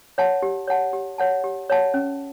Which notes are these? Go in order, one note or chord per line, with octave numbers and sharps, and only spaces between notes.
C#5 F#5 A5
G4
C#5 F#5 A5
G4
C#5 F#5 A5
G4
C#5 F#5 A5
C#4